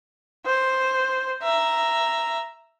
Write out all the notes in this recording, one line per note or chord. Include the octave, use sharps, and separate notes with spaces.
C5
E5 A#5